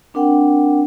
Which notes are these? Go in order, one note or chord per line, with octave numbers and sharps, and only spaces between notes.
C4 D4 A#4 F#5 G5